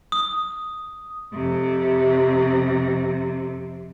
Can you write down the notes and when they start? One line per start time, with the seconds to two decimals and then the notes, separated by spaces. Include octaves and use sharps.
0.12 D#6
1.33 F2 C3